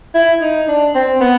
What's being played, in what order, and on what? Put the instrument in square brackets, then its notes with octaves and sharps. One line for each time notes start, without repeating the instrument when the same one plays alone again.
[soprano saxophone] E4
D#4
D4
C4
B3